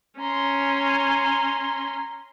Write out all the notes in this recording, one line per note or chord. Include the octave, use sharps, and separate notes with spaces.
C#4 A#5 C6